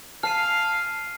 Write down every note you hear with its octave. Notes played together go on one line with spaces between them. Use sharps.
F5 A5 F6 C7 D#7